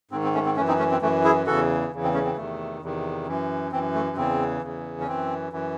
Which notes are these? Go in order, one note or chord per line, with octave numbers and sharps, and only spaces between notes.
G#2 D#3 C4
C4
A3 C#4
C4
F#2 E3 A3 C#4
C4 D#4
A3 C#4
C4
F#2 E3 A3
E4 G#4
E2 C#3 E3 F#4 A4
E2 C#3 E3
C4
A3 C#4
C4
E2 C3 D#3 A3
E2 C3 D#3
F#2 E3
F#2 E3 C4
A3
E2 C#3 E3 C4
E2 C#3 E3
C#4
F#2 E3 C4
F#2 E3